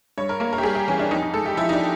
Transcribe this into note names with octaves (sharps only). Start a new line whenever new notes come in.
G2 C#5
A#4
A#3 A#4
A#4
G4
G3 G#4
G4
E3 C#4
D4
F2 D#4
D#4
G#3 A4
G4
F3 E4
D#4
D4